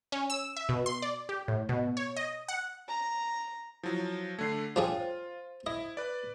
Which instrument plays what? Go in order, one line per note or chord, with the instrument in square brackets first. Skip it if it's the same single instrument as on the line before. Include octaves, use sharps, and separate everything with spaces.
[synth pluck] C#4
E6
E5
B2
C6
D5
G4
A2
B2
C#5
D#5
F#5
[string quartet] A#5
[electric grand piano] F3 F#3 [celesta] E4
[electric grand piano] D3 A3 [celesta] G#6 C7
[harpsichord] F3 D4 G#4 [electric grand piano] F4 [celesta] C#5 G5
[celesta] C5
[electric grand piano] E4 [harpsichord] D#5
[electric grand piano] B4 D5